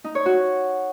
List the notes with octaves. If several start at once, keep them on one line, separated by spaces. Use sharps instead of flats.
D#4
C#5
F#4